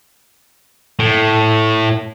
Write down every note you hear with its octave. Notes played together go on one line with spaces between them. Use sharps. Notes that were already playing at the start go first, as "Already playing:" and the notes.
A2